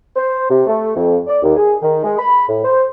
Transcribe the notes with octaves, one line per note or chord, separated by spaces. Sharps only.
C5
C3
A3
F2
D5
D#2
G#4
D#3
G#3
B5
A2
C5